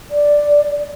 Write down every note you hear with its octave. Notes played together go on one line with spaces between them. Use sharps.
D5